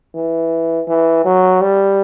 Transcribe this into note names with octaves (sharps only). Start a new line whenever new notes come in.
E3
E3
F#3
G3